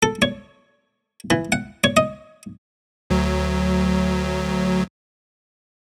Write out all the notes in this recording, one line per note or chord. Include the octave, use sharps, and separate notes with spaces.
A4
C#5
E3
F#5
C#5
D#5
D2 F#3